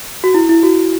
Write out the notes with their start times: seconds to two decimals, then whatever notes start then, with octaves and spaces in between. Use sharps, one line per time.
0.24 F#4
0.34 E4
0.49 E4
0.63 F#4